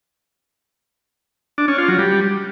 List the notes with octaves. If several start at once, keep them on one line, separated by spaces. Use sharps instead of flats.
D4
C#4
F4
F#3
G3